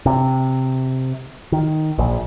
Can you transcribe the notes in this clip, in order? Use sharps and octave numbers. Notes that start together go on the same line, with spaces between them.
C3
D#3
A#1